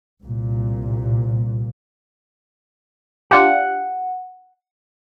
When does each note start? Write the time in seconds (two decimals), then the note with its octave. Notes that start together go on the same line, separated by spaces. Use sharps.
0.23 C2 A#2
3.31 D4 F4 G4 F#5